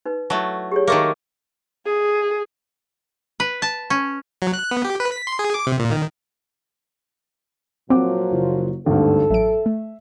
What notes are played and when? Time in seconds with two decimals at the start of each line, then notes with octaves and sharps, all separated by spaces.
0.06 D#4 B4
0.30 F#3 A3 E4 A5
0.72 G4 G#4 C#5
0.87 D#3 A3 A#3
1.85 G#4
3.40 B4
3.62 A5
3.90 C#4
4.42 F#3
4.54 F#6
4.71 B3
4.84 G4
5.00 B4
5.12 B6
5.27 C6
5.39 G#4
5.54 D6
5.67 C3
5.80 A#2
5.91 D#3
7.90 A#2 F3 F#3 C4 F#5 D6
8.31 F#1 F4
8.86 G#1 D2 G2 A4
9.30 A1 F#3 E5 D7
9.66 A3